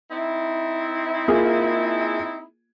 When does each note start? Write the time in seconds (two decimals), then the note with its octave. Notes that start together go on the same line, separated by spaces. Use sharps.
0.10 C4 D#4 E4
1.28 A#3 F4 G#4